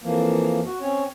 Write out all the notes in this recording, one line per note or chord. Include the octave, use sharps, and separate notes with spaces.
F2 E3 F3 A#3
F#4
C4 C#4 C#5